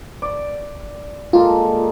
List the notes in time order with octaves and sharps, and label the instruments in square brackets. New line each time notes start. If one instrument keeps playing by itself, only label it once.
[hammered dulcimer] D5
[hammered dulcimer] G#3 A#3 A4 [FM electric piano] F4